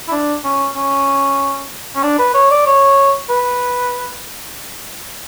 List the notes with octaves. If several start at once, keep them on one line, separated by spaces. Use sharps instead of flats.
E4
D4
C#4
C#4
C#4
D4
B4
C#5
D5
C#5
B4